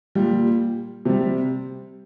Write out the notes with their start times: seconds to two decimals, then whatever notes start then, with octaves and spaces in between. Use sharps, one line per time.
0.15 A#2 G3
1.05 C3 G3